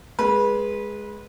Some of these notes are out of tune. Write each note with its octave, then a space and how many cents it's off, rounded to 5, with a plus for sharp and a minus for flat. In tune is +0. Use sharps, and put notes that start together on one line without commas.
G#3 +0 B4 -20